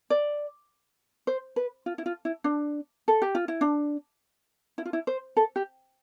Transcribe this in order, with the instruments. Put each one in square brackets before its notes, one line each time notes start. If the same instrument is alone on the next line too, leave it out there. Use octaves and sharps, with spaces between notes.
[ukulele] D5
C5
B4
F4
E4
F4
E4
D4
A4
G4
F4
E4
D4
E4
F4
E4
C5
A4
G4